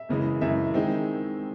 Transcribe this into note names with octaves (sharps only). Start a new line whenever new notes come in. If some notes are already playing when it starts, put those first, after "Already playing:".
Already playing: E5
F#2 C#3 E3 G#3
F#2 C#3 E3 G#3 E5
D#3 G#3 C4